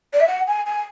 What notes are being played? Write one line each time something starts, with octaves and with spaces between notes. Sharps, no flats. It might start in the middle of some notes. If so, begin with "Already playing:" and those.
D5
E5
F#5
G#5
G#5